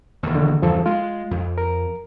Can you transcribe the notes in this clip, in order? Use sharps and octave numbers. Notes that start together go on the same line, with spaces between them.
E1 D#2
D3
E2 G2 C#3 F3 A4
G#3 F4
F2
A#4